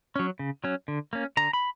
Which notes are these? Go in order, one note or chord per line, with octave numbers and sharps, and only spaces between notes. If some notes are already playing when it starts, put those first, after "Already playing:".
F#3 C#4
C#3
F#3 C#4
D3
A#3 C#4
D3 A#5
B5